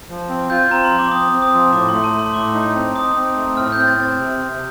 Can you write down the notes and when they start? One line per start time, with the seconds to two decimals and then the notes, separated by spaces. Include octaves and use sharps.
0.10 F3
0.29 C4
0.50 F4 G6
0.70 C4 A#5
0.85 C6
0.91 F3
0.99 D6
1.12 C4 D#6
1.32 C4
1.42 D#6
1.53 F3
1.73 A2 D6
1.89 A3 C6
2.04 A5
2.14 A3
2.19 C6
2.34 A2 D6
2.55 D#4
2.75 C4
2.95 D#4 D#6
3.15 C4
3.36 A3
3.57 A2 F6
3.72 C4 G6
3.88 A6
3.97 C4
4.03 A6
4.18 C3
4.38 C3